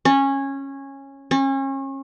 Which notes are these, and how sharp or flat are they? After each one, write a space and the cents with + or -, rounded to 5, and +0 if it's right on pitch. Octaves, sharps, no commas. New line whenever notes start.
C#4 -15
C#4 -35